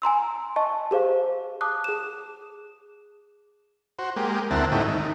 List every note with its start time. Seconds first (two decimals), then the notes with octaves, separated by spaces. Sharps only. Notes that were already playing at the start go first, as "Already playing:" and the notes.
0.02 G#5 A#5 C6 E6
0.56 D#5 A5 C#6
0.91 G4 G#4 C5 F5
1.61 A5 D6 D#6 F#6
1.84 G#4 E7
3.99 F#4 C5
4.16 G#3 A#3 G4
4.51 D2 C4 E4 A#4 F#5 A5
4.72 G#2 C#3 A3 D#4 E4 G4
4.88 D#3